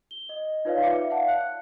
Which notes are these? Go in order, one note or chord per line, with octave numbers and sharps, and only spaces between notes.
G7
D#5
D#4 F4 B4 C#5 D5 F5
D5 E5 D6 C#7
F5 F#5 A5
F#6 C#7